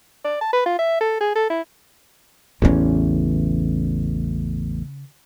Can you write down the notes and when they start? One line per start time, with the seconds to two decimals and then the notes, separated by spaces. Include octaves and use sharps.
0.24 D5
0.41 A5
0.53 B4
0.66 F4
0.79 E5
1.01 A4
1.20 G#4
1.35 A4
1.50 E4
2.62 A1 E2 C#3 C#4